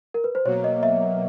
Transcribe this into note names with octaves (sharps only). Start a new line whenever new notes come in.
A#4
B4
C5
B2 F#3 A#3 C#5
D#5
E5